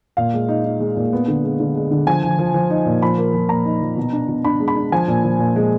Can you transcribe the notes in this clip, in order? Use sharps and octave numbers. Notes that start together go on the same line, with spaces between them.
A#2 F5
G#3
D#4
D#4
G#3
A#2
B3
D3
G#3
D3
G#3
D3
F3 G#5
F3
F3
F3
D#4
A#2
F3 B5
A#3
F3
A#2 A#5
D#4
F3
B2
D4
B2
D4 B5
G#3
B5
D4
F3 G#5
A#2
F3
A#2
G#3